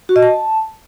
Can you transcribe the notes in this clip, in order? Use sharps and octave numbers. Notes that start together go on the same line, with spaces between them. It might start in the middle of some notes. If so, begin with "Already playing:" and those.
F#4
D#5
A5